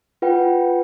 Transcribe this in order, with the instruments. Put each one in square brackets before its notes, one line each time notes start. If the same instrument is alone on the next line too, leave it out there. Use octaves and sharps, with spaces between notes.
[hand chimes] F4 B4 F#5 G5